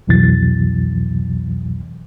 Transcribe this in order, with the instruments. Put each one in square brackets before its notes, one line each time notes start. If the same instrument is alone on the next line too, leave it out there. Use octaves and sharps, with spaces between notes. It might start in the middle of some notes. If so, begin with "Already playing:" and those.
[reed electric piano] C2 F2 B2 E3 F#3 A6